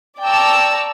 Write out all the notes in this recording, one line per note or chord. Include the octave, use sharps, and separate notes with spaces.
D5 G5 A5 A#5 C#6 E6